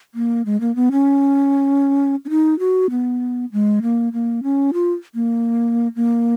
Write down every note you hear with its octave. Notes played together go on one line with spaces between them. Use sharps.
A#3
G#3
A#3
B3
C#4
C#4
D#4
F#4
B3
G#3
A#3
A#3
C#4
F4
A#3
A#3